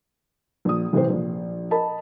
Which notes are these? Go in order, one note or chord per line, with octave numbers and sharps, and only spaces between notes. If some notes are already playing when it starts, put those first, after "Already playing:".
A#1 D#6
A1 C3 E3 C4 C5
A#1
A#4 D#5 A5 B5